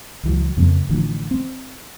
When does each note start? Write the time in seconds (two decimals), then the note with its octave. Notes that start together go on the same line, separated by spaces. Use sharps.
0.23 C#2 E3 F#3
0.57 F2 C#3 A#3 C4
0.89 A1 D3 E3 F3
1.31 C4